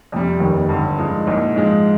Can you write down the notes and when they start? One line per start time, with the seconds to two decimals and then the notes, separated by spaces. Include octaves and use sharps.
0.12 F2 C3 G3
0.40 F1 D#2 D#3 G3
0.69 G1 G2 D3
0.98 G2 F3 G#3 D#4
1.26 C2 A#2 G#3 D#4
1.56 G#2 F3 G#3